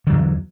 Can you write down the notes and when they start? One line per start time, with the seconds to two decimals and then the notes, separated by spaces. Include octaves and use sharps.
0.07 D3
0.09 F#3
0.12 E2